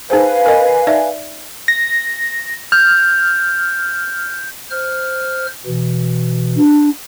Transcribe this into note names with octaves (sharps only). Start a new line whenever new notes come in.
D#4 G#4 B4 C5 F5 G#5
A#4 D#5
D#4 D5 E5
A#6
F6 G6
C5 F6
B2 E3
D4